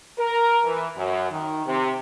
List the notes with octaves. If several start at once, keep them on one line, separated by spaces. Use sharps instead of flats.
A#4
E3
F#2
D#3
C3